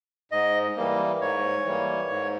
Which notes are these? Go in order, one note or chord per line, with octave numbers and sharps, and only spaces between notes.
G#2 D#5
E3 G3 A#3
G#2 C#5
E3 G3 A#3
G#2